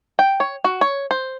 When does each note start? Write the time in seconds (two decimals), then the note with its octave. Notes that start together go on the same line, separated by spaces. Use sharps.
0.19 G5
0.40 C#5
0.64 F#4
0.81 C#5
1.11 C5